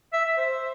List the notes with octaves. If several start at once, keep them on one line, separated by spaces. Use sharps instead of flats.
E5
E5
C5